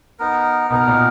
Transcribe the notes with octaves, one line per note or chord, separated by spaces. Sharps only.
B3 D#4 A#4
B2 B3 D#4 A#4
A#2